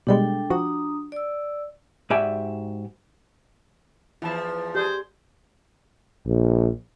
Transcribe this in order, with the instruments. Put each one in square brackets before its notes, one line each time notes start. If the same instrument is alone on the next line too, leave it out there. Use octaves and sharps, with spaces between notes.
[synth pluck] B2 G3 G#3 [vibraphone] D4 A4 G5
[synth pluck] F3 F#4 [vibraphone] D4 A#5 D#6
[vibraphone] D5 E6
[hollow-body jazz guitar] G#2 F#4 G4 D5 E5 G#5
[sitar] E2 F3 [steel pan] E4 A5
[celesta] G4 [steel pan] G#4 D5 [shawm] C5
[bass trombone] A#1